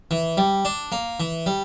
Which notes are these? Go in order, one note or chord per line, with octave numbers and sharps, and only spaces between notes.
E3
G3
D4
A#3
E3
G3